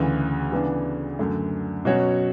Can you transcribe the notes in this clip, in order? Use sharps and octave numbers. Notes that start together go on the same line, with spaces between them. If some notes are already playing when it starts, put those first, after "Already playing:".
Already playing: D2 C#3 E3
C#3 E3 B3 D4
F#2 D3 A3
B2 F#3 C#4 F#4 C#5